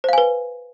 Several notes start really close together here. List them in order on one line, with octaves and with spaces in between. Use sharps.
C5 F5 G#5 B4